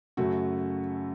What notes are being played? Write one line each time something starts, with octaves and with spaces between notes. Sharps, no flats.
F#2 C#3 F#3 A3 F#4